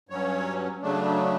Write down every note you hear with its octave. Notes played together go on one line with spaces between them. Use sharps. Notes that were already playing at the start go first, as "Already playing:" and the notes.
G2 F#3 C#4 C#5
C#3 F#3 A3 D4